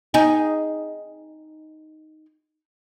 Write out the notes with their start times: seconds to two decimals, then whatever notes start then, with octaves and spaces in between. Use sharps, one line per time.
0.14 D#4 G#4